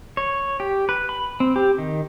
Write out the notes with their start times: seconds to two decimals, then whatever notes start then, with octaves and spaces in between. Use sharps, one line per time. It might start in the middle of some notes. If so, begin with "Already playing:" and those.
0.17 C#5
0.60 G4
0.89 B4
1.09 B5
1.40 C4
1.56 G4
1.79 D#3